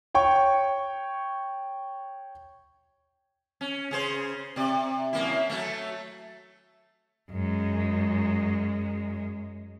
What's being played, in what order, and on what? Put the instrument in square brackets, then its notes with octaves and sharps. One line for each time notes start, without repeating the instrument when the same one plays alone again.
[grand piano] C#5 G5 C#6
[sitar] C#4
C#3 G#4 C5
C3 D5
F#2 A#3 E4
F#3 A3
[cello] F#2 G#3